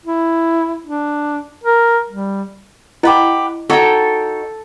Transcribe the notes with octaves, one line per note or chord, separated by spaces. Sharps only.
E4
D4
A#4
G3
E4 G4 B4 D#5 F#5
D#4 F#4 A4 C#5 G5